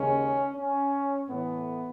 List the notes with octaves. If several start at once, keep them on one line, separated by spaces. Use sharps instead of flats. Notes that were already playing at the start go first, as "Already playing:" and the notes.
Already playing: D#2 C#3 G#3 C#4
C#4
A2 E3 A3 B3